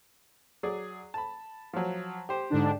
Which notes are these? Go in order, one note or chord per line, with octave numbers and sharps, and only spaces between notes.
F#3 G#4 D5
A5 B5
F3 F#3
G4 C5
G#2 D3 D4